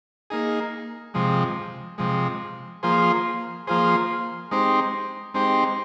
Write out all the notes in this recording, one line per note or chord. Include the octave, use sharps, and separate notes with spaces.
A#3 D#4 G#4
C3 F3 G#3
C3 F3 G#3
F3 A#3 F4 G#4 C5
F3 A#3 F4 G#4 C5
G#3 C4 D#4 G4 C5
G#3 C4 D#4 G4 C5